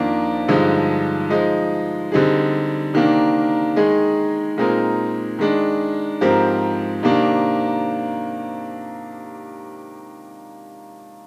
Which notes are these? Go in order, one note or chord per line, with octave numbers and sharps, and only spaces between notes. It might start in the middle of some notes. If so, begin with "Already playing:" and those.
Already playing: F2 D#3 A#3 D4
G2 D3 F3 G#3 D#4
F3 G#3 D#4
D3 G3 C4 D#4 G#4
C3 D#3 A#3 D4
D#3 G#3 D#4 G#4
A#2 G#3 C4 D#4 A#4
D#3 G#3 D4
G#2 F3 C4 G4 A#4
C3 D#3 A#3 D4